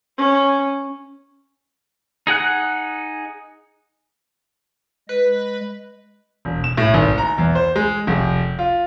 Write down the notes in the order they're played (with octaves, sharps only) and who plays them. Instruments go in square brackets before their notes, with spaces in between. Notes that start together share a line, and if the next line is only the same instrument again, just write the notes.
[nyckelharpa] C#4
[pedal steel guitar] D#4 G#4 F#5 F#6
[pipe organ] G#3 D#5 [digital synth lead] B4
[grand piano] E1
E7
A2
G#1
A#5
E2
C5
G#3
F1
F4